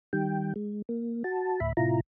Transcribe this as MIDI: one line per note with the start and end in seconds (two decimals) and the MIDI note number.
0.13 0.54 51
0.13 0.54 55
0.13 0.54 79
0.56 0.82 56
0.89 1.23 58
1.24 1.60 66
1.24 1.60 81
1.60 1.73 38
1.60 1.73 45
1.60 1.73 76
1.60 1.73 83
1.77 2.00 45
1.77 2.00 48
1.77 2.00 64
1.77 2.00 65
1.77 2.00 82